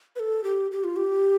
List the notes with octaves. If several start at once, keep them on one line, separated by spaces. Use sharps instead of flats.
B4
A4
G4
G4
F4
G4